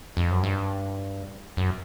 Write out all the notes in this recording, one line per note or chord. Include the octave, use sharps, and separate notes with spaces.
F2
F#2
G2
F#2